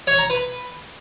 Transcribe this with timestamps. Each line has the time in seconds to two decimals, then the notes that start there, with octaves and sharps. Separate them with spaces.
0.07 C#5
0.19 A#5
0.30 B4